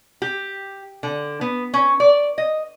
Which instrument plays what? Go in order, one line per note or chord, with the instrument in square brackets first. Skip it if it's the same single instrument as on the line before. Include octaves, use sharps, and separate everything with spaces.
[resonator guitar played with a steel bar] G4
D3
B3
C#4
D5
D#5